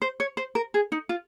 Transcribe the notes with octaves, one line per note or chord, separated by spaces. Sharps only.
C5
C#5
C5
A#4
G#4
D#4
F4